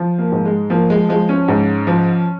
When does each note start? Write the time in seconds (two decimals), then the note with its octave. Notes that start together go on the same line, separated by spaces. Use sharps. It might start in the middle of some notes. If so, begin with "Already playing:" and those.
Already playing: F3
0.18 A#3
0.32 G#2
0.45 G#3
0.70 F3 A#3
0.90 G#3
1.09 F3 G#3
1.29 C#4
1.48 G#2
1.87 F3